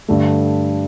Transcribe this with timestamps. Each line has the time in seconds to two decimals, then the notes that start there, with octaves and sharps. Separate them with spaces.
0.08 G2 D3 A3